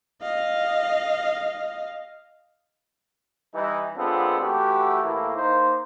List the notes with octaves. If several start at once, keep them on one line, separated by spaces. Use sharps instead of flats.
D#5 F5
E3 G3 D#4
G#3 B3 C4 D4 F4 A4
E3 A3 F#4 G4
A2 E3 A#3
A#3 D#4 C5